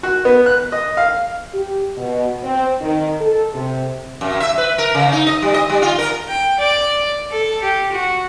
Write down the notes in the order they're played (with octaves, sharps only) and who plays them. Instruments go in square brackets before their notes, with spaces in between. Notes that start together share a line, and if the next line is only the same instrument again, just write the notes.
[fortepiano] F#4
B3
F#6
D#5
F5
[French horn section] G4
B2
C4
D#3
A4
C3
[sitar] F#2
E5
B4
A#4
C#3
D#4
D#5
G3
D#5
G3
F4
A#4
[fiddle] G5
D5
A4
G4
F#4